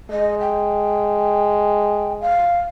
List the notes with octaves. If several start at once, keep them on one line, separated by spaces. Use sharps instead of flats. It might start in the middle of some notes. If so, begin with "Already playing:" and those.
G#3 D#5
G5
F5